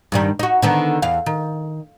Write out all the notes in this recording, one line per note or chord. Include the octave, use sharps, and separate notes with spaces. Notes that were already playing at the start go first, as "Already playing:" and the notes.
G2 D#3 G3
D#4 F#4
D3 D#3 B3
E2 F5
D#3